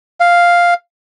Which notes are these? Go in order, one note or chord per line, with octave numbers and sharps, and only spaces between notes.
F5